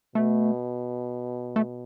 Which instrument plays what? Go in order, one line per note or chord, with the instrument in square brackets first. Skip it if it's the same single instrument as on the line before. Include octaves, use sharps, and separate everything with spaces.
[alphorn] B2 [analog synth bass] A3
[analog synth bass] A3